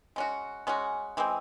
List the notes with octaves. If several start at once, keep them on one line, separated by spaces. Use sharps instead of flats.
G#3 C#4 F#4
G#3 C#4 F#4
E3 G#3 C4